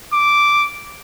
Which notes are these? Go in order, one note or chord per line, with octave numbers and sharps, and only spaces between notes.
D6